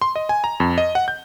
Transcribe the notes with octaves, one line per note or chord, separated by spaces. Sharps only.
C6
D#5
G#5
A#5
F2
D#5
F#5
G6